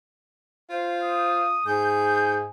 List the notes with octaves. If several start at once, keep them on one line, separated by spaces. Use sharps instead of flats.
F4 C5
D#6
G#2 G#4 G6